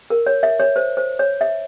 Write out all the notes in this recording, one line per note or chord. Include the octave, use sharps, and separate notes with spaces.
A#4
C#5
E5
C#5
C5
C5
C#5
E5